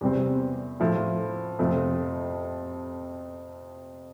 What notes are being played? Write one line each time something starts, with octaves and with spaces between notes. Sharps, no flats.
E2 C3 G3 C4
A2 F3 A3 E4
F2 C3 F3 A3 C4